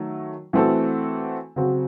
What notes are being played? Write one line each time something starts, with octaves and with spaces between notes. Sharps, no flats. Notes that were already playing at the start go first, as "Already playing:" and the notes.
Already playing: D#3 F#3 A3
E3 A3 C4 F#4 A4
C#3 F#3 C4 F#4